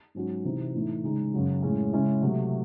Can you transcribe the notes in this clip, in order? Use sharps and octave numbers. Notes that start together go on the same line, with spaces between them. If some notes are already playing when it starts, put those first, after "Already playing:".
G#2 F#3 C#4 F#4
C3 E3 C4 D#4
A2 E3 A3 D#4
C#3 G#3 D#4
F#2 C#3 F#3
A2 G#3 C#4 G#4
C#3 G#3 C#4 E4
C3 F#3 A3